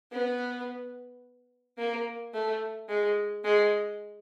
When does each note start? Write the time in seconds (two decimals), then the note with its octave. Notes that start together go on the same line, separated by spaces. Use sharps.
0.12 B3
1.78 A#3
2.34 A3
2.89 G#3
3.44 G#3